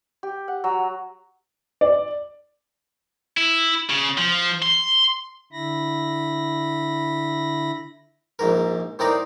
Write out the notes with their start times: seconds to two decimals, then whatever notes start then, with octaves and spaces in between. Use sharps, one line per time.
0.23 G4
0.48 F#5
0.64 F#3
1.81 D5
3.37 E4
3.90 C#3
4.18 F3
4.62 C6
5.52 D3 E4 B5 A#6
8.39 A#1 G#2 A#4
8.99 A2 C4 D#4 A#4 D5